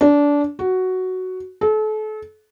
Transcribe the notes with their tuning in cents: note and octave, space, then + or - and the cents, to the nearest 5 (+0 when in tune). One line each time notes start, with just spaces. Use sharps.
D4 -20
F#4 +5
A4 -35